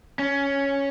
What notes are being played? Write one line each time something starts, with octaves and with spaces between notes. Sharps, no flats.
C#4